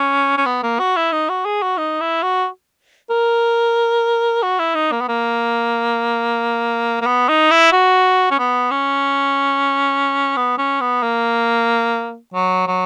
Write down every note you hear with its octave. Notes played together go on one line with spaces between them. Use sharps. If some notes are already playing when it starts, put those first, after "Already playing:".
Already playing: C#4
C#4
B3
A#3
F#4
E4
D#4
F#4
G#4
F#4
D#4
E4
F#4
A#4
F#4
E4
D#4
A#3
B3
A#3
A#3
B3
D#4
E4
F#4
C#4
B3
C#4
B3
C#4
B3
A#3
F#3
F#3